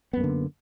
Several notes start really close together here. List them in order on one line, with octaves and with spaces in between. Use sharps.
B3 F#2 A#3 D3